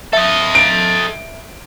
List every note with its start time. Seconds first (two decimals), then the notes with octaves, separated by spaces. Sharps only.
0.13 A4 D#5 E5
0.55 D7